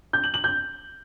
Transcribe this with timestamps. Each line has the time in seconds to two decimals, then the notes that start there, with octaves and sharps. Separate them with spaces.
0.13 G6
0.24 F#7
0.34 F#7
0.44 G6